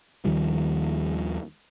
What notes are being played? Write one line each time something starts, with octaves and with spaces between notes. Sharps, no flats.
D#2 D#3 F3 G3